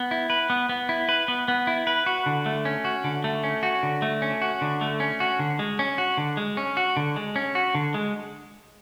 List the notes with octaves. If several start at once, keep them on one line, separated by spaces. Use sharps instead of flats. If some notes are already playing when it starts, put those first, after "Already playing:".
Already playing: B3
E4
B4
B3
B3
E4
B4
B3
B3
E4
B4
F#4
D3
A3
C#4
F#4
D3
A3
C#4
F#4
D3
A3
C#4
F#4
D3
A3
C#4
F#4
D3
G#3
C#4
F#4
D3
G#3
C#4
F#4
D3
G#3
C#4
F#4
D3
G#3